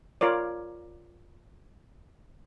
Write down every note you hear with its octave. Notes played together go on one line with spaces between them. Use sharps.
F4 A#4 C#5 D5